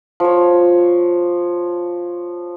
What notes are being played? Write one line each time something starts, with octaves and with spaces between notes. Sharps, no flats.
F3 C#5